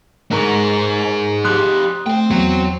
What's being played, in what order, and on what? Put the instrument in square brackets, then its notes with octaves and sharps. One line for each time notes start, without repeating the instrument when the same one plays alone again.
[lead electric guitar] G#2 [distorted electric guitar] D#4 G#4 [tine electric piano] A#4 A#5 C#6
[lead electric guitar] F3 G4 [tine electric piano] C6 D#6 F#6
[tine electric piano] A3 [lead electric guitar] C5 G5
[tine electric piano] E2 [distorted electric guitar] F#3 F#4